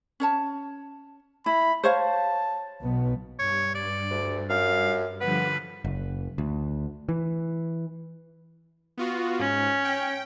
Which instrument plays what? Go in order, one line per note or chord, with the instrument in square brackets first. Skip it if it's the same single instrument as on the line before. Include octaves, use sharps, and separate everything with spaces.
[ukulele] C#4 C#5 A5
[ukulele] E4 [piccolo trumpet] B5
[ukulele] C5 C#5 F5 [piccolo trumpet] A5
[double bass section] B1 B2 B3
[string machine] G2 [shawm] C#5
[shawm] D5
[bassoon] D2
[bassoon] F#2 [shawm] F5
[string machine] D3 F3 G3 [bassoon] B3 [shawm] B4
[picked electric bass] F#1
D2
E3
[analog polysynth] B3 F4 F#4
[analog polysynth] G#2 [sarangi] C#4
[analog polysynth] G5